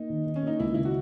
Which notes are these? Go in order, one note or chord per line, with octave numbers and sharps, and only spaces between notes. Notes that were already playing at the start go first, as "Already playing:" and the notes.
Already playing: A#3 D#4
D#3
D#3
C#4
A#3 D#4
C#2 E4
C#3 E4
F#4